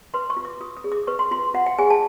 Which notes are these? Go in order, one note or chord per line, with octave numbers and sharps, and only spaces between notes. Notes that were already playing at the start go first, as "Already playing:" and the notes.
B4 C6
C#6
F4
D6
F4 D#6
D#6
G#4
D6
B4 C#6
C6
F4 C6
F4 F#5
G5
G#4 G#5
A5